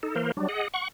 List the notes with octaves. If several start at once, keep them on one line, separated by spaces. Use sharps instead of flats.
D#4 A4
E3 A#3 A#4 C5
F#3 G3 D4
G#4 D#5 F#5
F#5 C#6